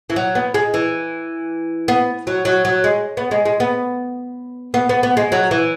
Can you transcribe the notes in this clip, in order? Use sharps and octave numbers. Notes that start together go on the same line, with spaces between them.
E3
F#3
B3
G#3
E3
B3
F#3
F#3
F#3
G#3
B3
G#3
G#3
B3
B3
B3
B3
G#3
F#3
E3